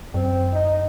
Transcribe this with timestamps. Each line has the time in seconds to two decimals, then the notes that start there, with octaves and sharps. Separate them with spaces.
0.14 F#2 C4
0.53 D#4